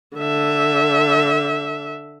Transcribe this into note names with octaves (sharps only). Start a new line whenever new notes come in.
D3 E5